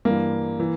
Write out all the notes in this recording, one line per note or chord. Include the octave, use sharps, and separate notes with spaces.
G2 E3 A#3
E3